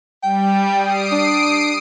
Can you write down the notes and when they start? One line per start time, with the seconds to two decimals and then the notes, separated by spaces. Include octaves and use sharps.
0.23 G3 G5
0.76 D#6 C7 D7
1.12 D4